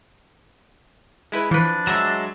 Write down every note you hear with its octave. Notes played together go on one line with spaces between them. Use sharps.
G#3 E4 B4
E3 F3 D4 B4
F#3 G#3 E5 E6 A#6